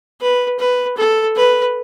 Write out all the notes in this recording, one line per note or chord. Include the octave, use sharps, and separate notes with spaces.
B4
B4
A4
B4